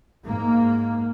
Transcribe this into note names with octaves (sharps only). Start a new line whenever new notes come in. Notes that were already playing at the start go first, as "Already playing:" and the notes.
G#2 A#3